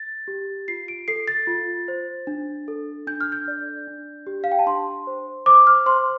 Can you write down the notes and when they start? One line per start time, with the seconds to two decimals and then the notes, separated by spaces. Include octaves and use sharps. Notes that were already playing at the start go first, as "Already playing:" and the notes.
Already playing: A6
0.28 G4
0.68 F4 C7
0.88 D7
1.08 A4 C7
1.28 A6
1.47 F4
1.88 C5
2.27 D4
2.68 A4
3.07 D4 G6
3.21 F6
3.32 G6
3.48 D5
3.87 D4
4.27 G4
4.44 F5
4.52 G5
4.59 A5
4.66 D4 C6
5.07 C5
5.46 C5 D6
5.67 F6
5.86 C5 C6